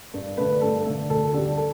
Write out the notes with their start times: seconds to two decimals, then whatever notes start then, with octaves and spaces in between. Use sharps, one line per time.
0.14 G2
0.37 D3 A3 B4
0.62 G2 A4
0.86 D3 A3
1.10 D2 A4
1.34 D3 G3 G4
1.57 A4